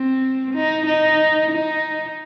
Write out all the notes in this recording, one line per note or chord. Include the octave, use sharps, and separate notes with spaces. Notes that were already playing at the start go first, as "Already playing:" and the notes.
Already playing: C4
D#4
D#4
D#4